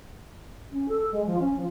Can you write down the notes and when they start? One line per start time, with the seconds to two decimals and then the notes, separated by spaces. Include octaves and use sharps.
0.71 C#4
0.88 A4
1.12 G#3
1.26 F3
1.40 C#4
1.56 F3